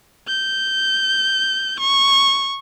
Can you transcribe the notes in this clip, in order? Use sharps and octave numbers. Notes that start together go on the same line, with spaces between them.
G6
C#6